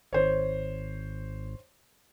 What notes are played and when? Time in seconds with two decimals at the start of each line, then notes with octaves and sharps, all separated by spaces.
0.13 G#1 C5 C#5